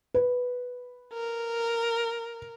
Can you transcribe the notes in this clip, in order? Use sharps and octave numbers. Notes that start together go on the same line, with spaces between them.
B4
A#4